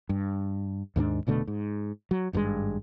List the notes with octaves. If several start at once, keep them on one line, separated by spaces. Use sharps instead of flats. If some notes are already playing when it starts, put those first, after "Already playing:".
G2
D#2 G#2 B3 D4
F1 B2 D3 A3
G#2
F#3
G#1 G2 D#3 G#3